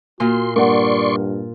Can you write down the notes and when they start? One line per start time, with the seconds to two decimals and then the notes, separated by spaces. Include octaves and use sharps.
0.20 A#2 F#4 C6
0.56 G2 A#3 D5 F#5 C6 C#6